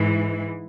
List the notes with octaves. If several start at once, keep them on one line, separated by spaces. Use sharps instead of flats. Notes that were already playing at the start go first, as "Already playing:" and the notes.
Already playing: G#2 E3